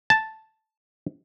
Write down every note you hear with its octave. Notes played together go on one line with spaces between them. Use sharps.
A5